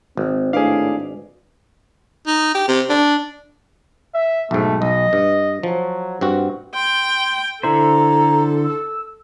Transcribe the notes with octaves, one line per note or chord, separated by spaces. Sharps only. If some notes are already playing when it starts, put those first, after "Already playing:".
G#1 C4
A2 D4 G#4 B4 D5 F5
D#4
G4
C3
D4
E5
B1 G#2 A3
B1 D#5
G2
F3 F#3
G2 C4 F#4
G5 C6
D3 E4 A4 C5 A#5
E6